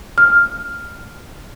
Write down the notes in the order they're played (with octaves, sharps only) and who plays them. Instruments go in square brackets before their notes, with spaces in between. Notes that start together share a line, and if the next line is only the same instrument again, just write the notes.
[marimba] F6